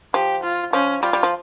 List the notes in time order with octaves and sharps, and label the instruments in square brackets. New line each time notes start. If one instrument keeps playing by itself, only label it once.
[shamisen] F3 [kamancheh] G4
[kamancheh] F4
[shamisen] F3 [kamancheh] C#4
[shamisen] G3 [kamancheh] F4
[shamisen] G3
F3